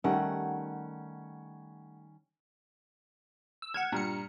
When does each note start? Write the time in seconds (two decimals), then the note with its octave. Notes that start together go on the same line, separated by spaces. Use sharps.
0.04 D#3 G3 A3 C#4 F#5 G5
3.62 E6
3.74 F#5 F6 G#6 E7
3.92 G2 A#2 A#5 C#7